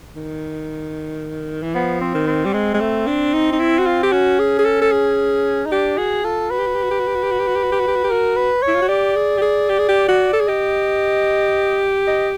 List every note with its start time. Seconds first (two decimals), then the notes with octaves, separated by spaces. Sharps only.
0.16 D#3
1.62 E3
1.75 F3 B3
2.01 C4
2.14 D#3
2.27 C4
2.46 G3
2.54 G#3 C4
2.74 G#3
2.80 A3
3.07 D4
3.33 D#4
3.52 D#4
3.60 E4
3.79 F#4
3.86 F4
4.03 G4
4.12 C#4 F#4
4.39 G#4
4.59 G#4
4.65 A4
4.82 A4
4.92 G#4
5.66 D#4
5.72 D4 G4
5.98 F#4 G#4
6.24 F4 A4
6.50 F#4 B4
6.59 G4
6.67 F#4
6.75 G4
6.84 F#4
6.91 G4
7.00 F#4
7.07 G4
7.15 F#4
7.23 G4
7.32 F#4
7.40 G4
7.48 F#4
7.56 G4
7.64 F#4
7.72 G4
7.80 F#4
7.87 G4
7.96 F#4
8.04 G4
8.10 F#4 A#4
8.36 B4
8.63 E4 C#5
8.75 F4
8.82 F#4
8.89 G4 D5
9.16 G#4
9.37 G4
9.42 G#4
9.69 G4
9.79 G#4
9.89 G4
10.09 F#4
10.33 A4
10.40 G#4
10.48 G4 D#5
12.07 D#5